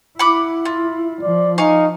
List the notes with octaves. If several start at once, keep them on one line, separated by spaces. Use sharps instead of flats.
E4 F#5 B5 D6
F4
F3 D5
D#4 F5 G#5 C#6